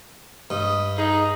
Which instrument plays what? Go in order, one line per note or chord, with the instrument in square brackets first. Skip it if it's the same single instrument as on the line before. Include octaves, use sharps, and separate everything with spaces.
[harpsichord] G2 [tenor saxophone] D#5
[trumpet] D#4 [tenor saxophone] G#4